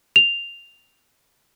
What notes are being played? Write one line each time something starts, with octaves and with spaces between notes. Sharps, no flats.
F7